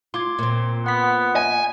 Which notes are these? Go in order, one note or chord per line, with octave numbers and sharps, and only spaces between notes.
F4 C6 D6 G#6
A#2 C4
B3 F#5 B6
G#5